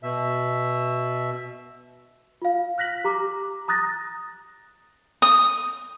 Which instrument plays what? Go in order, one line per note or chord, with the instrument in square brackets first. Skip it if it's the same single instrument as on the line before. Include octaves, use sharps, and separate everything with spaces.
[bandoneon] B2 E5
[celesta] F4 F5
F6 F#6 A#6 B6 F#7
G4 A#5 D6
A#5 D#6 F#6 A6 A#6
[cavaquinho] D#6